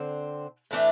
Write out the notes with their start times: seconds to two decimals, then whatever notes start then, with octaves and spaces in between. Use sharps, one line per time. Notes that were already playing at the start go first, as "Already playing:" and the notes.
Already playing: D3 C4
0.71 A2 E3 A3 D4